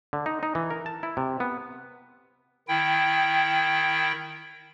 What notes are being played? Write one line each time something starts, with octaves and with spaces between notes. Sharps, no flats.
D3
D#4
D#4
E3
A#4
A5
E4
C3
B3
D#3 E4 G5